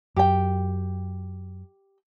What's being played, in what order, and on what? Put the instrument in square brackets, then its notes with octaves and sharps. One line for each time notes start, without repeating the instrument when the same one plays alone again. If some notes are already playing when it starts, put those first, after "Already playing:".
[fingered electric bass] F#2 [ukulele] G4 G5